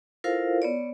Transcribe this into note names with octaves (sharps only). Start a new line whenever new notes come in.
E4 F4 A4 A#4 C5 F5
B3 C#5 D5